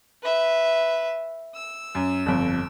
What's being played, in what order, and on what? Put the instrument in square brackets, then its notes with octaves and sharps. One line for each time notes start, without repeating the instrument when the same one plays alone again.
[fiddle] B4 E5
E6
[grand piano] F#2
G1 F2